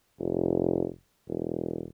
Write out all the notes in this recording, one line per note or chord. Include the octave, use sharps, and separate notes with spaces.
F1
E1